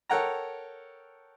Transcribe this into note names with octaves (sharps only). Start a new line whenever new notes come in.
A4 A#4 C#5 F#5 G5 A#5